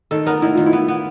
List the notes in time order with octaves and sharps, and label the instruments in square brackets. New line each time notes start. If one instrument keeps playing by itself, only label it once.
[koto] D#3 [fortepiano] A4
[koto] B3 [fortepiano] A#4
[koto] D#3 [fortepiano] E4
[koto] D#3 [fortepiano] F4
[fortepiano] E4
[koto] B3
B3